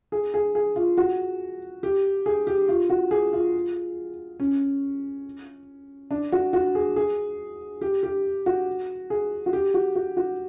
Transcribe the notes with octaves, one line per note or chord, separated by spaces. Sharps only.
G#4
G#4
G#4
F4
F#4
G4
G#4
G4
F4
F#4
G#4
F4
C#4
D4
F#4
F#4
G#4
G#4
G4
G4
F#4
G#4
F#4
G4
F#4
F#4
F#4